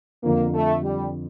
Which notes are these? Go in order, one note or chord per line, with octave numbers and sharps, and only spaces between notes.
F2 D3 F3 A#3
A3
G3